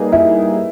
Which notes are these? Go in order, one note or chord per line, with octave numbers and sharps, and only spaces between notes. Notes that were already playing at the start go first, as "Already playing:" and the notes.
Already playing: G3 A#3 D#4 G#4 B4
E4